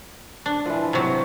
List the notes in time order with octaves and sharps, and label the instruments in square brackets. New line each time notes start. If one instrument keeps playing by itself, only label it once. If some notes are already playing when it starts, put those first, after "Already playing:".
[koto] D4
[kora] E3 F3
[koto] C3 F#3